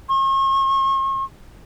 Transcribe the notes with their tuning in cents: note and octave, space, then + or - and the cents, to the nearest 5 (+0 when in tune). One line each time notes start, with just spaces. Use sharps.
C#6 -45